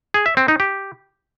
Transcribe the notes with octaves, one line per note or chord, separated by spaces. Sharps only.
G#4
E5
C4
D#4
G4